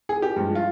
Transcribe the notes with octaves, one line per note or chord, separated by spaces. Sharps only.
G#4
G4
G2 F3 G#3
F4